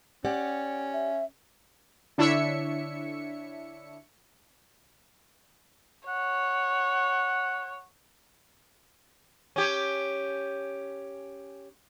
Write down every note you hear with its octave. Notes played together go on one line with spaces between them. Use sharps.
C#4 G4 D5 F#5
E5
D3 D4 E4 C#5 E5 C#7
C#5 F#5
C#4 G4